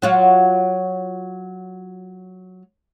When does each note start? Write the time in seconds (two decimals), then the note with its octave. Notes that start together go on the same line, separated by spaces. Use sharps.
0.02 F#3 F4 F#4